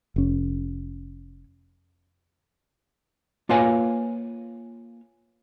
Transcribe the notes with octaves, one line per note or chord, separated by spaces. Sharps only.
F1 C#4
A#3 F4 B4 C#5 F5 G#5